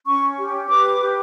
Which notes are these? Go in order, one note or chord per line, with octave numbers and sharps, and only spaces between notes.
C#4 C#6
G4
B4 D6
G4